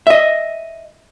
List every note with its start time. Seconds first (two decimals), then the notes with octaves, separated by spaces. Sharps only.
0.07 D#5 E5